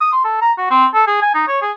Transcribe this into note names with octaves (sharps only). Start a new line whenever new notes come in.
D#6
C6
A4
A#5
F#4
C4
A4
G#4
G#5
D#4
C#5
G#4